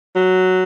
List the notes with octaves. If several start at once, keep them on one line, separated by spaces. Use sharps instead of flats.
F#3